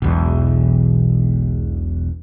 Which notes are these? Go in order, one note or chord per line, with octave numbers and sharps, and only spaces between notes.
E1 B1 E2